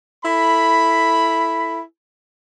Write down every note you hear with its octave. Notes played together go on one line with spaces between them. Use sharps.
E4 A4 B5